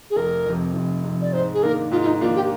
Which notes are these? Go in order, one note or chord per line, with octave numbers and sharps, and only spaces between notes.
G#4
F1 A#4
F2 C3
F1
F2 C3
D5
G#2 C5
G#4
D#3 A#3 D4 A#4
G#2 F4
F4
D#4
D#3 A#3 D4 F4
G4